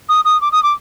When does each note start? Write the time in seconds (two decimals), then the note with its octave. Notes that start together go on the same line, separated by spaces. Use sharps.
0.09 D#6
0.25 D#6
0.41 D6
0.52 D#6
0.63 D6